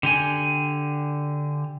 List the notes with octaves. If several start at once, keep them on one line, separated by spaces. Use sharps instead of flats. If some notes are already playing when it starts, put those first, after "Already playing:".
D3 G4 G#5